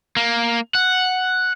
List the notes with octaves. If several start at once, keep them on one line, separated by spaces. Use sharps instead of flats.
A#3
F#5